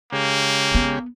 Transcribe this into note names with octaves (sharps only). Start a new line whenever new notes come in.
C#3 G#3 A#3 G4
B3